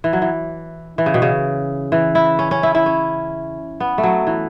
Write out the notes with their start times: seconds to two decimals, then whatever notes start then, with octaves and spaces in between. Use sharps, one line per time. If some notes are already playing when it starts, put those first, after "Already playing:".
0.04 E3
0.13 F#3
0.22 E3
0.98 E3
1.06 C#3
1.14 B2
1.22 C#3
1.92 E3
2.15 E4
2.39 C#4
2.51 C#4
2.63 E4
2.75 E4
2.86 C#4
3.80 B3
3.98 A3
4.03 F#3
4.27 E3